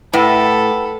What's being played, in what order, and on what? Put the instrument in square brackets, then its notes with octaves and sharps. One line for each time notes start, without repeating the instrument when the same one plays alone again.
[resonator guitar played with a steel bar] A2 [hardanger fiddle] A4 B5 [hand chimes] B4 F#5 G5